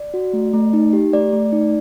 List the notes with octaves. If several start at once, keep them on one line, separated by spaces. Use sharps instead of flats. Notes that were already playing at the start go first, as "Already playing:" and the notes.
Already playing: D5
F#4
A3
A3
D#4
G4
A3 D5
A3
D#4